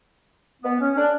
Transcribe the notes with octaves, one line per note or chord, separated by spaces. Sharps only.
B3
C#4
D4